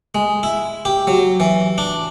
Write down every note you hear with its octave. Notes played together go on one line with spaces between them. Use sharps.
G#3
E4
G4
F#3
E3
D4